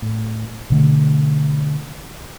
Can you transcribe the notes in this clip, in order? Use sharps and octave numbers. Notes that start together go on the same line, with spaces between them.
A2
B2 D3 A3